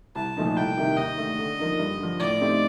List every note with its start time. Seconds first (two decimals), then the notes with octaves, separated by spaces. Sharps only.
0.15 C2 A5
0.37 A#2 F3 A3 D#4
0.56 C2 G5
0.77 C3 D#3 A#3 D#4
0.98 D#2 D#5
1.18 D3 A3
1.39 D3
1.59 F3 A#3 D#4
1.79 G2
1.99 D3 F3
2.20 A2 D5
2.41 A3 C4 D#4 G4